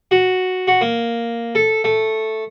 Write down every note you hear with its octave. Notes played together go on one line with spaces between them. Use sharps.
F#4
F#4
A#3
A4
A3